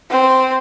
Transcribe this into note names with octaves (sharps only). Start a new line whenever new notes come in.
C4